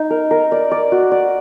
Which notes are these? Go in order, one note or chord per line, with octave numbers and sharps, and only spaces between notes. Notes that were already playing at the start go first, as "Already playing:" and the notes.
Already playing: D#4
A#4
A#4
D5
D5
F#4
D5